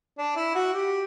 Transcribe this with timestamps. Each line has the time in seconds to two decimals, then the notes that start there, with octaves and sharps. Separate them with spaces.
0.18 D4
0.36 E4
0.55 F#4
0.74 G4